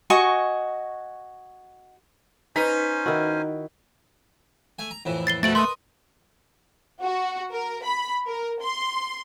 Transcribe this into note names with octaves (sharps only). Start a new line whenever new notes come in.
F#4 D#5 G#5 C#6
C#4 D#4 B4 C5 G#5 B6
D#3 E4 F#4
A3 G#5
A#5
F2 A2 E3
A6 C7 G7
F2 B2 A3 F#4 A6 D7 F#7
A#4 B4 D#5 C6
F#4
A#4
B5
A#4
C6